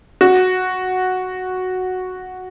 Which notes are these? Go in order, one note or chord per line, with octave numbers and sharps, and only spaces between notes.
F#4